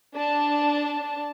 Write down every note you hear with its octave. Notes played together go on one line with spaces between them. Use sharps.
D4 A5